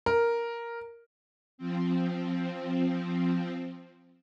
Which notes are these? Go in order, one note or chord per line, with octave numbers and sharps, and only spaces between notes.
A#4
F3 C4